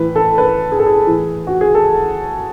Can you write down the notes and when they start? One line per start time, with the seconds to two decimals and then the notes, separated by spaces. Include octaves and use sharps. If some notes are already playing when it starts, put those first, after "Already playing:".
Already playing: A2 E3 B4
0.16 A4
0.38 B4
0.72 G#4
0.79 A4
0.86 G#4
1.06 A2 E3
1.47 F#4
1.61 G#4
1.75 A4